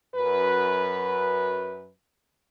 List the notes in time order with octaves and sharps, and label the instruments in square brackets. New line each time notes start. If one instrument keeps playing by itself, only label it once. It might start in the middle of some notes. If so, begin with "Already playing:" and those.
[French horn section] F#2 B4